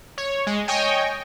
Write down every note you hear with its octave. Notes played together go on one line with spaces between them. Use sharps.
C#5
G#3
C#5 D#5 G5 G#5